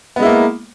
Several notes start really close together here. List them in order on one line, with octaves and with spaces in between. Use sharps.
B3 G#3 E4 A#3